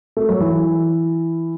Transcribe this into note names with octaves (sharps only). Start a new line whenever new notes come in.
A3
F#3
E3